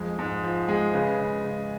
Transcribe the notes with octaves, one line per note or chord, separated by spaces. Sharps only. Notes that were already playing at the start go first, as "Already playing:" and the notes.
Already playing: F2 G#3
G#2
F3
G#3
C#3 B4
C#3
C#3